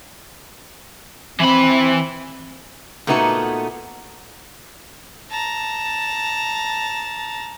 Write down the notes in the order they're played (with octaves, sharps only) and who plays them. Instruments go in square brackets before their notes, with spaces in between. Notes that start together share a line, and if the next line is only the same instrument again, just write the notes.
[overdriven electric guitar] E3 B5 [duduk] C4
[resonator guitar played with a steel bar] A#2 A3 B3 D#4 F#4 A4
[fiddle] A5 A#5